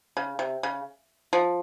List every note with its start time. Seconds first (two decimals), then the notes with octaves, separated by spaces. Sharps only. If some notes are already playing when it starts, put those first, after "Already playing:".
0.17 C#3
0.39 C3
0.63 C#3
1.33 F3